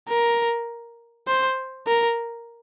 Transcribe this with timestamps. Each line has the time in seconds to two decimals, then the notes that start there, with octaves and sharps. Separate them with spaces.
0.09 A#4
1.28 C5
1.87 A#4